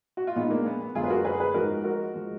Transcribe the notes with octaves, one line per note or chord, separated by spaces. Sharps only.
F#4
F4
A#2 F3 G#3 B3 D#4
A#3 D4
B3
B3
F#2 D3 G#3 F4 G#4
B4
F#4 A#4
G#4 B4
G#4 B4
G#2 F3 G#3 F#4 A#4
F#4 A#4
F3 G#3